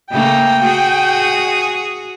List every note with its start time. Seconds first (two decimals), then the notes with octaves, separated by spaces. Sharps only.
0.10 C#3 A3 A#3 G5
0.63 F#4 G#4